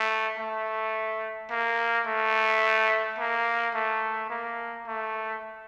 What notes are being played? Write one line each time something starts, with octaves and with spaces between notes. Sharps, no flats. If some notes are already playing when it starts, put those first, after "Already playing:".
Already playing: A3
A3
A#3
A3
A#3
A3
A#3
A3